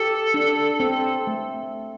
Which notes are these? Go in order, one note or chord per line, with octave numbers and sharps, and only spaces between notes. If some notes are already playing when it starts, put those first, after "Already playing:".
Already playing: G4 A4
D4
C4
A3